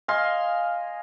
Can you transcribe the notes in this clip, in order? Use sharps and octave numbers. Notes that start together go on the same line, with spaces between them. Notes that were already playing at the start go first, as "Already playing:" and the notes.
D#5 F5 G#5 C6